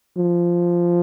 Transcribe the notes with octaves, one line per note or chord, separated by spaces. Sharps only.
F3